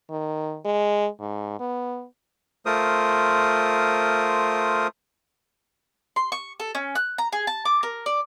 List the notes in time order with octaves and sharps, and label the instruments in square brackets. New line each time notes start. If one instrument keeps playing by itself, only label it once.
[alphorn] D#3
G#3
G#2
B3
[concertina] A3 F4 A#4 C5 D#6
[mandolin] C6
C#6
A4
C#4
F#6
A#5
G#4
A5
D6
A#4
D5